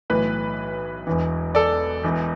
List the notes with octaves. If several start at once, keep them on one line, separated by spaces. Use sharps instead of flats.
B1 A2 E3 B4
E1 E2 E3
A4 D5
E1 E2 E3